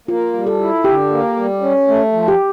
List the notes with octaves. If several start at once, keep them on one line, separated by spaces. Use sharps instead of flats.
A#3 F4
G3
A4
E4
D3 G4
A#3
G3
C#4
A3
F3
G4